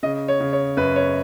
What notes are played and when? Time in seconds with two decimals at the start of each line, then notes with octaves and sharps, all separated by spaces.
0.03 C#3 D#5
0.28 C#5
0.40 C#3
0.53 C#5
0.77 F#2 B4
0.96 C#5